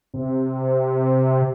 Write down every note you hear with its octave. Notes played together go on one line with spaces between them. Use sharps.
C3